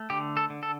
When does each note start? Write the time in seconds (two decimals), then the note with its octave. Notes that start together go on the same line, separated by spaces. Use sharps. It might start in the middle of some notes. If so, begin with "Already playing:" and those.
Already playing: A3
0.10 D3 G4
0.37 A4
0.50 D3
0.63 A4